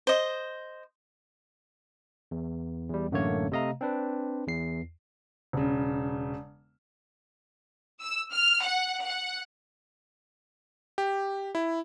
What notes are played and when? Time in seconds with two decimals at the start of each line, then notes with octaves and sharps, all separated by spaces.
0.07 C5 D#5
2.31 E2
2.90 E2 G3
3.11 A1 F#2 D3 A3 A#3 C#5
3.52 C3 A3 D#5 F5 A#5
3.81 C4 D4 B4
4.47 E2 C7
5.53 E1 C#3
8.00 E6
8.32 F6
8.63 F#5
9.04 F#5
10.98 G4
11.55 E4